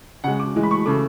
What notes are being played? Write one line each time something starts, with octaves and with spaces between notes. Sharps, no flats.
C#3 G#3 F#5
D6
A2 E3 G#3
B5
C#6
C#3 E3 A3 D6